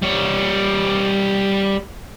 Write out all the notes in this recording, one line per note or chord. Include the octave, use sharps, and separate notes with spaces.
G3 C#5